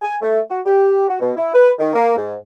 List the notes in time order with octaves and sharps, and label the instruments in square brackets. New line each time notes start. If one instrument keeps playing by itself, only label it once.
[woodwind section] G#5
A3
F#4
G4
F#4
B2
E4
B4
D#3
A#3
G#2